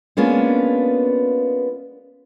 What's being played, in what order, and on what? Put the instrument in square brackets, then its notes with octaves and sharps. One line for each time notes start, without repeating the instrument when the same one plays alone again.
[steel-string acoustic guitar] G#3 A#3 B3 C#4 D4 F4